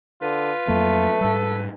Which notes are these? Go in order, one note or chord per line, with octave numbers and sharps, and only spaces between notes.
D3 F4 B4
F2 F#3 A3 A#3
G#2 G3 A4